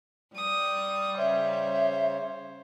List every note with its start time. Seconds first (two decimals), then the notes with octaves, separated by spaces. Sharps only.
0.35 G3 D#6
1.18 C#3 C5 C#5 E5